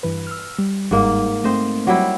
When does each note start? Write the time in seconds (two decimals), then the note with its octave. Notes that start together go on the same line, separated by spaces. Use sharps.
0.03 G2 E3 B4
0.27 E6 F6
0.58 G3
0.91 G1 G#2 G3 A#3 D#4
1.44 A3 C4 C5 D#5
1.87 F#3 G3 E4